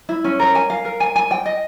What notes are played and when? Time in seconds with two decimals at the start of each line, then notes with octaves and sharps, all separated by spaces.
0.09 E4
0.24 C#4
0.40 A#4
0.55 G#5
0.70 F5
0.85 A#4
1.00 G#5
1.16 G#5
1.31 G5
1.46 D#5